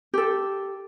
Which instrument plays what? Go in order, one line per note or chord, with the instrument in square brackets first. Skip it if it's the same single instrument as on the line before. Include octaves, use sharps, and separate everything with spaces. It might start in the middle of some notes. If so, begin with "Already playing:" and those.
[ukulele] G4 A4